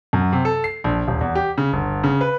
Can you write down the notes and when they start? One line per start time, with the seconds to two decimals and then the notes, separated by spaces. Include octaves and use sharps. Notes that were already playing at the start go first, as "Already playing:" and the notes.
0.13 F#2
0.33 C3
0.45 A4
0.64 C7
0.84 A#1
1.08 D#1
1.21 E2
1.35 G4
1.58 C#3
1.73 G1
2.04 C#3
2.21 B4